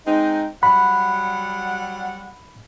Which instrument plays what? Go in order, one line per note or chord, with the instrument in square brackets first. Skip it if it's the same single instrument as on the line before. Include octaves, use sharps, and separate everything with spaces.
[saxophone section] G#3 C4 D#4
[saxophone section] F#3 G3 F#5 [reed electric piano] B5